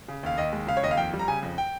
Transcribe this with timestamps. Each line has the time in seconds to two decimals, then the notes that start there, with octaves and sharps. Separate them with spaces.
0.08 C#3
0.23 D#2 F5
0.38 D#2 D#5
0.53 G#3
0.67 C#3 F5
0.77 C#5
0.83 D#2 D#5
0.91 F5
0.97 F2 G5
1.13 G3
1.19 A#5
1.28 C#3 G#5
1.43 F2
1.58 G5